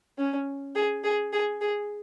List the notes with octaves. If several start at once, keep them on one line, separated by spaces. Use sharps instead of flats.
C#4
G#4
G#4
G#4
G#4